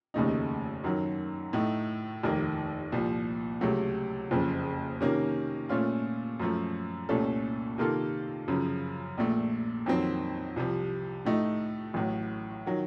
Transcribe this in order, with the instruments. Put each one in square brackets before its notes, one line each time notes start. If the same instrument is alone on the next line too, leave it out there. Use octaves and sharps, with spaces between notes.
[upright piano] F1 D#2 C#3 A3 D#4
F#2 D#3 F#3
A2 A3 D#4
F1 D#2 D#3 A#3
C2 A#2 F3
C#2 C3 F#3 A3
F#1 F2 C#3
C3 D#3 A#3 C#4
A#2 A3 C#4 F4
F#2 F3 A3
C2 A#2 A3 C#4 A4
C3 D#3 A#3 F4 A4
F#2 C#3 F3
A#1 A#2 A3
F2 D#3 F#3 C4
C2 C3 F3
A2 A3 D#4
A1 A2 F#3
D#3 F#3